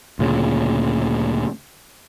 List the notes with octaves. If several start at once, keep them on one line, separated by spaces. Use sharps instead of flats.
D2 A#2 C#3